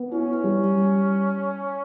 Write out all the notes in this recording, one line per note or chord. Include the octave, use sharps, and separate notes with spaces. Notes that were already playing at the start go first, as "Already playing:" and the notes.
Already playing: B3
C#4 E4
G3
G3